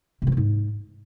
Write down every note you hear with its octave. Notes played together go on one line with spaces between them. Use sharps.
C3
F3
A3
G#2